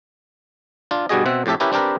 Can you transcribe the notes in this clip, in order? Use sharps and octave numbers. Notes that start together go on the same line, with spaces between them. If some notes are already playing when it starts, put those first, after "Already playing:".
D4 F4
G2 B2 G3 F#4 G#4 D#5
B2 C4 E5 F#5
F2 A2 G4 A4 E5
C#4 E4 G4 A#4 B4
C4 D4 G4 A#4 B4